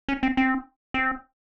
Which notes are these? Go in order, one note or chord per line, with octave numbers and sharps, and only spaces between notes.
C#4
C4
C4
C4